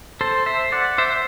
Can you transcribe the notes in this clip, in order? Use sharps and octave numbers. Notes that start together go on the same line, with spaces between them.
A4 C5
C5 E5
D5 F#5
C5 E5